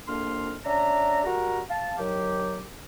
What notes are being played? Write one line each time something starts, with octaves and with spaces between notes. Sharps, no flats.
C2 F2 A#3 D4 C6 F6
C#4 D4 E5 A#5
G3 F#4 A#4 A#5
F5 A5
D#3 F#3 G4